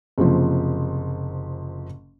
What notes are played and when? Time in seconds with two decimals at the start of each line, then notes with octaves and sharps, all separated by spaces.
0.18 F#1 C3 F3